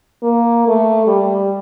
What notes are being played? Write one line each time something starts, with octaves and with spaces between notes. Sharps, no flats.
A#3
A3
G3